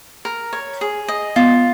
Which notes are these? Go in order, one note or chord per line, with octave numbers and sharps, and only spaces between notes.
A#4
C#5
G#4
D#5
B3 F4